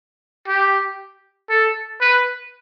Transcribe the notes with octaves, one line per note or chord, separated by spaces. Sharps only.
G4
A4
B4